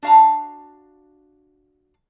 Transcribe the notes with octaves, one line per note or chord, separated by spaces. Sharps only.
D4 F#4 F5 A5 A#5